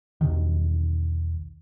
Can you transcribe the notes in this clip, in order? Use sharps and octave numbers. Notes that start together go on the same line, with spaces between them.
E1 B1 D#3